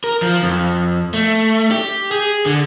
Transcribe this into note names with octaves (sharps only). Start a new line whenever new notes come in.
A#4
F3
F2
A3
G4
G#4
D3